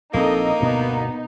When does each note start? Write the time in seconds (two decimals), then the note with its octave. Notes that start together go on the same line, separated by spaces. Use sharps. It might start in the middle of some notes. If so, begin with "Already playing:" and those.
0.14 A#1 A#2 A#3 C4 D#4 A4 D#5
0.60 D2 G2 B2 B3